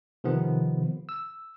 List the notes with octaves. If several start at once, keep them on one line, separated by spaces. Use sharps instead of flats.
C3 D#3 F3 B3
E6